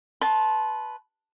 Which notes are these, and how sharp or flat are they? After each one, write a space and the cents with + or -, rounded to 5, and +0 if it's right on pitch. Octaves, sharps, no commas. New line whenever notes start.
B4 +0 A5 -20 C6 +20